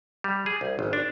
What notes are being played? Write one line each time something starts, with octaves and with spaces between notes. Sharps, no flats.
G3
G#4
C2
G#1
D4